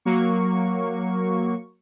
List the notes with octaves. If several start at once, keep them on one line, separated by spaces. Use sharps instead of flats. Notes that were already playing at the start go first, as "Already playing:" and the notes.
F#3 A#3 C#6